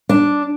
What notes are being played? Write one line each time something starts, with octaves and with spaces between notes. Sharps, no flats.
D4